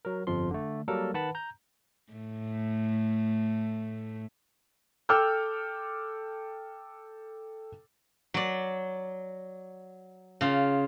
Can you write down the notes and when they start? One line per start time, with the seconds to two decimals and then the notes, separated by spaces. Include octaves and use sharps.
0.05 F#3 A#4
0.27 G1 F2 F3 C6
0.51 D3 A3
0.88 F#3 G3 A#3 A4 A#4
1.14 D#3 B4 F#5 A5 B5
1.35 A#5 G6
2.13 A2 A3
5.09 A4 G5 D6 E6 F6 G6
8.34 F#3 D5
10.41 C#3 F4